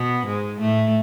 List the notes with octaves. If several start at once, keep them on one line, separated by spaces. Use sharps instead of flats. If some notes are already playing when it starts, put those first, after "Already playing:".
Already playing: B2 B3
G#2 G#3
A2 A3